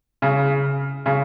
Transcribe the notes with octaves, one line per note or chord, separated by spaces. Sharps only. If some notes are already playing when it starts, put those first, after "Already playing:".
C#3
C#3